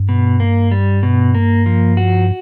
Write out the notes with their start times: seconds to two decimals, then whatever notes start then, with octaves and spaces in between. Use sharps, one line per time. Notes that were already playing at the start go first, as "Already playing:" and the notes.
Already playing: G2
0.09 B2
0.40 A#3
0.71 G3
1.03 B2
1.35 A#3
1.66 F3
1.97 F#4